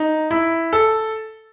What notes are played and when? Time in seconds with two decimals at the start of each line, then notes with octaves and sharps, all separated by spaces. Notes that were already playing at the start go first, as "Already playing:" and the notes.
Already playing: D#4
0.31 E4
0.73 A4